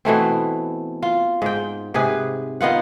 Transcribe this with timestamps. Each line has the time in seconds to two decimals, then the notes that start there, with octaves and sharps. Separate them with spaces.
0.05 B2 E3 A3 C4
1.03 F4
1.42 G#2 G5
1.94 G#2 C3 G#4 B4
2.61 D#3 B3 F4 F#5